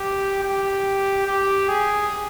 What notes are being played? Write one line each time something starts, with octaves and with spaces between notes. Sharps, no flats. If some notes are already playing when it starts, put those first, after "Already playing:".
Already playing: G4
G4
G4
G#4